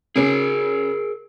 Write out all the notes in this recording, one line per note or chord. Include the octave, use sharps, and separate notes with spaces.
C#3 C#4 G#4 A#4